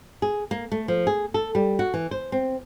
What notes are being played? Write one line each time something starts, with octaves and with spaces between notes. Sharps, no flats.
G#4
A#3
A3
F3
G#4
A4
G3
F#4
E3
C5
C4